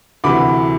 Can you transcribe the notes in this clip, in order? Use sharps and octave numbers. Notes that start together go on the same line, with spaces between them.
D2 C3 E3 B5 D6